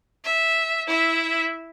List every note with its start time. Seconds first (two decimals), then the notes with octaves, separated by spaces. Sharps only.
0.24 E5
0.87 E4 E5